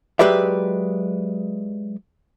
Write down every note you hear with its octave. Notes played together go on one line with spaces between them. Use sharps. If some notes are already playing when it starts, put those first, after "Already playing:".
F#3 G#3 G4 B4 D5 E5